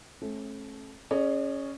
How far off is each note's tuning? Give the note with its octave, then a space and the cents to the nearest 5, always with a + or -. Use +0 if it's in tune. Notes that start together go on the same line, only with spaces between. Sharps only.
A3 -25 C#4 -45
C#4 +0 G#4 +0 D5 +45